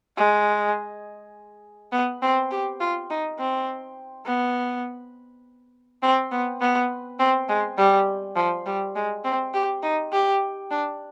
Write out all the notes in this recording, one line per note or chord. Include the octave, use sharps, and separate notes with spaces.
G#3
B3
C4
G4
F4
D#4
C4
B3
C4
B3
B3
C4
G#3
G3
F3
G3
G#3
C4
G4
D#4
G4
D4